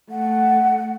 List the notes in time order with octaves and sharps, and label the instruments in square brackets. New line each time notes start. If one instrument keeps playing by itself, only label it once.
[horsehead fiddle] A3 [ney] F#5